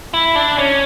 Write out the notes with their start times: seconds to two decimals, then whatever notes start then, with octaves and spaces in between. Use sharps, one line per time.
0.14 E4
0.36 D4
0.58 C#4